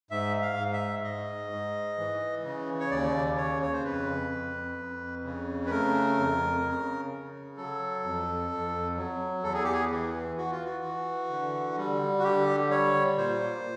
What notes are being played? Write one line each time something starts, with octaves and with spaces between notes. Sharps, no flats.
G#2 E5
F5
G#2
E5
G#2 D#5
G#2
E3
C#3
C#5
D#2 D5
C#3 C#5
C#5
C5
F2 B4
F2
F2
C#3
B4
A3 A#4
F2
C#3
C#3
F#3 A4
F2
F2
F#3
E2 A4
G#4
G4
G#4
E3
E3 F#4
F4
F#4
E3
D3
G3
F#4
D3 G4
G3 C#5
A#2 C5